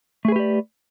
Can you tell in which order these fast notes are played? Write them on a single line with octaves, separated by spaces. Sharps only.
A3 G#4 B4 G4 D5